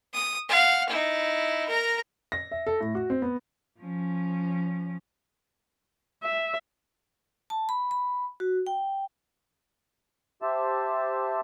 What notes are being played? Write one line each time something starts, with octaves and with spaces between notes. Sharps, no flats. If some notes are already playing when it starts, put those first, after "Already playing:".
D#6
F5 F#5
D#4 E4
A#4 A#5
A#6
E5
A4
A2
F#4
C4
B3
F3 C#4
E5
A5
B5
B5
F#4
G5
G4 C5 E5 A5